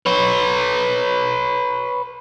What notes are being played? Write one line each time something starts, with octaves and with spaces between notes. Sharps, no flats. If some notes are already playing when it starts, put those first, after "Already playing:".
B4 C#5